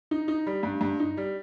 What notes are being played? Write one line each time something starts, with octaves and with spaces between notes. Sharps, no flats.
D#4
D#4
G3
G2
G2
D#4
G3